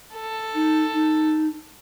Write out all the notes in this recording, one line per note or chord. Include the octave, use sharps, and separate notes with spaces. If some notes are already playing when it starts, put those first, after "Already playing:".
A4
D#4
D#4